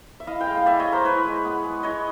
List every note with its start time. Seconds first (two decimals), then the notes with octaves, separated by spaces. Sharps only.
0.20 E5
0.27 E4 D#5 F5
0.41 F5 G5
0.46 G#3
0.57 F5
0.66 B3 D5 E5
0.79 C#5 D#5
0.86 G#3
0.92 A#4 C5
1.05 E4 B4 C#5
1.25 G#3
1.44 B3
1.64 G#3
1.83 E4 C#5 D#5